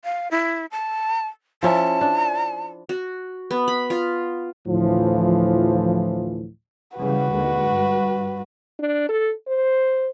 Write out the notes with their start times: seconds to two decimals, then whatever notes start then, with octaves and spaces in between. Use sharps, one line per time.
0.04 F5
0.31 E4
0.71 A5
1.63 F3 C#4 E4 A5
2.01 D4
2.89 F#4
3.51 B3
3.68 B5
3.90 F4
4.68 D2 A2 E3 F3
6.97 C#3 E3 G3 F#4 B4
7.32 D#2 D3 G#3
7.67 G2
8.79 D4
9.09 A4
9.48 C5